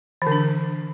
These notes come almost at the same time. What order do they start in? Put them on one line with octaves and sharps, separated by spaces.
E3 D3 D4